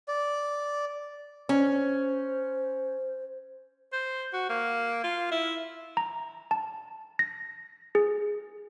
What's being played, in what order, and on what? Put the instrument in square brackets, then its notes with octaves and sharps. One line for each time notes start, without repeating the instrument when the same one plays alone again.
[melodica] D5
[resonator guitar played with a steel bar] C#4 [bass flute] C5
[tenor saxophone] C5
F#4
A#3
F4
E4
[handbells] A#5
A5
A#6
G#4